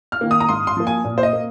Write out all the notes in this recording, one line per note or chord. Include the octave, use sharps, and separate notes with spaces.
F6
D#3 A#3
D#6
A#5
G#2 C6
C6
F3 A#3
G#5
A#2
C5
D#5
A#3